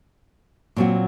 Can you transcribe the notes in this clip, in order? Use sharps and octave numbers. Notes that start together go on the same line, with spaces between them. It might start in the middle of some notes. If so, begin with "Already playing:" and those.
A#2 F#3 C4 F#4